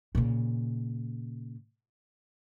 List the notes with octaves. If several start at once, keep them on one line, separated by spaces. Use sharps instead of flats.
A#2 C#3